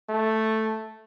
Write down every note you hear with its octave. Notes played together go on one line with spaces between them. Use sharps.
A3